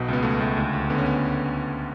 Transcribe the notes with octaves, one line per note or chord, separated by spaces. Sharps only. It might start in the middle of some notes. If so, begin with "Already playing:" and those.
Already playing: B1 B2
C#2 B3
C#2 A3
C#2 A3
D2
D2
D3 B3
C#4
B3